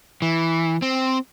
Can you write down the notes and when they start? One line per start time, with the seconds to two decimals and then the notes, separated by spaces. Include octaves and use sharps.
0.22 E3
0.82 C4